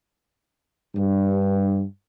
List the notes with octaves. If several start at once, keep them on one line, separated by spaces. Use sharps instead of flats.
G2